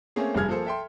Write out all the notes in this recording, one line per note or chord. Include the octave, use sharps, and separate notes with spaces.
A3 A#3 C4 C#4 G#4
F1 G2 G3 G#4 F6 G#6
F3 A#3 G#4 A4 C5
A4 E5 G5 C6